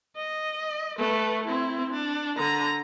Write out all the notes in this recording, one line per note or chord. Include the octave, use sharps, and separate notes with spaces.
D#5
A3 B4
C4 E4
D4
D3 A#5